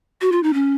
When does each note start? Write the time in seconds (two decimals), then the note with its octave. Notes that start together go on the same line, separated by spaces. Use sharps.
0.22 F#4
0.32 F4
0.43 D#4
0.54 C#4